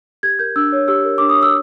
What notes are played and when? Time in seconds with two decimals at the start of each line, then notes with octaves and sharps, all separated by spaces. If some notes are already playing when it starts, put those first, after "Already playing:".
0.23 G4 G#6
0.39 A#4 G6
0.56 D4 E6
0.72 C#5
0.88 G4 E6
1.05 A#4
1.18 D4 D6
1.29 D#6
1.37 C#5 E6